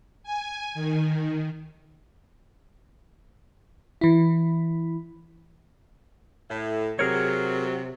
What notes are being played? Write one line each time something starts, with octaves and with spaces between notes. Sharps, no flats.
G#5
D#3
E3 E4
A2
C3 F#3 G#4 A#4 C#5